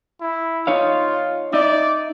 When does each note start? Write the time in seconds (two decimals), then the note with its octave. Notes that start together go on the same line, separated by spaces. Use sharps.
0.21 E4
0.67 D#4 F4 C#5 F5
1.53 D#4 D5 E5